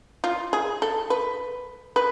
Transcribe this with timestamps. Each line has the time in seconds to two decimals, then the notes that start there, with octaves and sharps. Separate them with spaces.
0.24 F4
0.53 G#4
0.82 A4
1.10 B4
1.96 B4